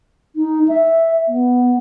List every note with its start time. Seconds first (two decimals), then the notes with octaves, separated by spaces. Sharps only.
0.36 D#4
0.68 E5
1.28 B3